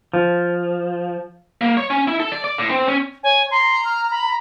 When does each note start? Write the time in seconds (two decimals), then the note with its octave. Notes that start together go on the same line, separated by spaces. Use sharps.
0.14 F3
1.61 A#3
1.77 C#5
1.90 C#4
2.08 E4
2.20 A4
2.32 D5
2.44 D5
2.58 A2
2.71 C4
2.88 C#4
3.23 C#5 G#5
3.51 A#5 C6
3.85 F6
4.11 B5